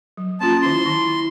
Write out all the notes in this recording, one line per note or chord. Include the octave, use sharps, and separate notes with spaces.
F#3
A#3 C#4 F4 A5 C6
D#3 C#4 E4 C6
D#3